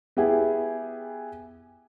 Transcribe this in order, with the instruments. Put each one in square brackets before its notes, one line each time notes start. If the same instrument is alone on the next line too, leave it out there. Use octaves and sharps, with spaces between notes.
[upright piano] B3 E4 G4 G#4